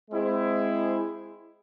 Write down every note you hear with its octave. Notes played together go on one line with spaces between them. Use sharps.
G#3 C4 E4 G#4 C5